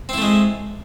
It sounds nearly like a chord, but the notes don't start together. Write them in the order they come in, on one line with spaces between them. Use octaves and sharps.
C4 E4 A3 G#3